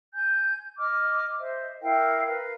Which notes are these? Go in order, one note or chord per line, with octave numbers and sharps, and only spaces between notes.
G#5 G6
D#5 D6 F6
C5 D#5 E5
E4 A#4 F5 G5
A#4 B4 F5